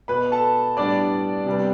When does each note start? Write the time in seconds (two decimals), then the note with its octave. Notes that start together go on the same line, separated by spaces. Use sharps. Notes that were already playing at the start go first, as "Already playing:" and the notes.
0.08 B2 B3 B4 B5
0.32 A4 A5
0.77 A2 G3 B3 D4 D5
1.46 C3 G3 B3